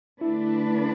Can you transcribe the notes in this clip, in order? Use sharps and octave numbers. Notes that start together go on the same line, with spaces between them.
D3 A3 D4 E4 B4